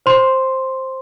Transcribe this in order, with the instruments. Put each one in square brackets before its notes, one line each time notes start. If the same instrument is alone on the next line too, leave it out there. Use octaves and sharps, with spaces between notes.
[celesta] C5 C6